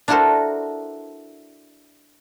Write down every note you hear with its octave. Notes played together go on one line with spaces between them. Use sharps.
D4 E4 F#4 A4 A#4 C5